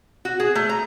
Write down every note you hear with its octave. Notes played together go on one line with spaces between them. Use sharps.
F#4
G#4
A3
A#5